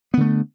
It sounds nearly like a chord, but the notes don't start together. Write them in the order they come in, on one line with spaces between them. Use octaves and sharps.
B3 D3 A3